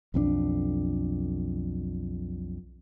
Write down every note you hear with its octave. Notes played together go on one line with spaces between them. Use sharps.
B1 F2 C4 D4